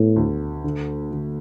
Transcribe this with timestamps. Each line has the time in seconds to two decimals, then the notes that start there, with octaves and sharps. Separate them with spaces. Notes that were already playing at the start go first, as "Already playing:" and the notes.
Already playing: A2 B3
0.16 D2
0.64 D3
1.11 D3